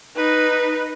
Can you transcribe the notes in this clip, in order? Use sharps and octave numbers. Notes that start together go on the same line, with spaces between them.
D#4 B4